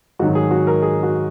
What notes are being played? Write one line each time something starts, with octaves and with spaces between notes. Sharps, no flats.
G#2 D#3 F#3 F#4
G#4
F#4
A#4
G#4
F#4